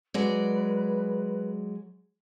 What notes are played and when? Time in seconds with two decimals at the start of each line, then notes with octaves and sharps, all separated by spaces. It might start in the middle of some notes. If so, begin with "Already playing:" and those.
0.14 F#3 G#3 B4 D5